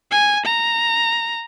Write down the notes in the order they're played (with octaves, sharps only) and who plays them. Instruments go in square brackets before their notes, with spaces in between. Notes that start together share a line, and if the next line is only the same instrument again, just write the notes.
[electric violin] G#5
A#5